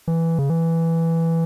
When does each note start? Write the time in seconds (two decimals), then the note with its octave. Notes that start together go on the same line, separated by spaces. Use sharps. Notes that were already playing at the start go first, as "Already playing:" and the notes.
0.08 E3
0.39 C#3
0.50 E3